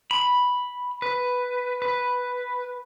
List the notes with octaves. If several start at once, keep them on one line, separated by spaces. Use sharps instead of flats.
B5
B4
B4